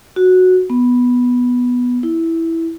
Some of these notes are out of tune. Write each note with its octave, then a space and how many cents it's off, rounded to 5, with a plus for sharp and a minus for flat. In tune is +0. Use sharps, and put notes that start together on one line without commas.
F#4 -5
B3 -5
E4 -5